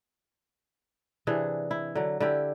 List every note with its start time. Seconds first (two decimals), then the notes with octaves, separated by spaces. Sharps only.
1.27 C3 E3 D4 G#4
1.71 E4
1.95 D3 F#3
2.20 D3 E4 G4